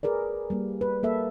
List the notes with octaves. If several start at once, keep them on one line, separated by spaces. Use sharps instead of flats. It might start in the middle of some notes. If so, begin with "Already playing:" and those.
G#4 A#4 B4 D5
G3 A#3
B4
A#3 A4 E5